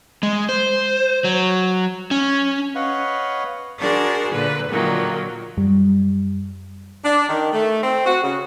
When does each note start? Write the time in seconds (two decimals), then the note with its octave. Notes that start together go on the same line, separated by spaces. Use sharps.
0.23 G#3
0.49 C5
1.24 F#3
2.11 C#4
2.75 B4 C#5 D#5 F5 F#5 B5
3.79 D4 F#4 G#4 A#4 C5
4.30 A#2 D3 B4
4.68 A#2 D3 D#3 F3 F#3 A#3
5.57 F#2 G3
7.05 D4
7.29 D#3
7.52 A3
7.83 C4
8.05 F#4
8.23 C#3